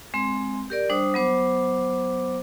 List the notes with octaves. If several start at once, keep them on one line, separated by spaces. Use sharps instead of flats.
G#3 C4 C6
G4 A#4 D5
G3 D4 C5 D#6
F#3 B3 C5 D6